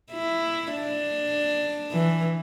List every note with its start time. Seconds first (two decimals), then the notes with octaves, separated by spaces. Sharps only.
0.12 E4
0.73 D4
1.92 E3